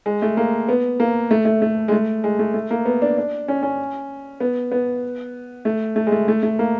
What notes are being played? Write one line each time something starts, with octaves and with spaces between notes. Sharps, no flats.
G#3
A3
A#3
B3
A#3
A3
A3
A3
G#3
A3
G#3
A3
A3
A#3
B3
D4
D4
C#4
C#4
B3
B3
A3
A3
G#3
A3
A3
A3
A#3